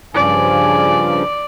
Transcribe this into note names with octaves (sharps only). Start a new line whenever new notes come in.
G2 C#3 F3 D5 G#5